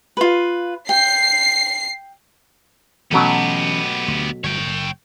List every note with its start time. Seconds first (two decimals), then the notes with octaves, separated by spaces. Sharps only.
0.17 F4 B4
0.89 G5 C7
3.12 B2 E3 F#3 A3 B3 C#4 G4
4.08 D2
4.44 G1 C#5 G5
4.67 F#1